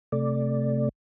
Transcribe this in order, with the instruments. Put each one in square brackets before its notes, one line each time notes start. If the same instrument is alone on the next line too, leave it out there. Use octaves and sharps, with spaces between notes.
[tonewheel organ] C3 A3 D5